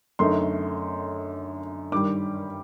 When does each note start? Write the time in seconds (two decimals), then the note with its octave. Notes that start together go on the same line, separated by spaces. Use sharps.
0.19 F#2 D3 A3 D#4 C6
1.92 G2 D#3 G3 D6